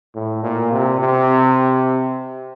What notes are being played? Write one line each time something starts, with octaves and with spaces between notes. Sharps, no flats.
A2
A#2
C3
C3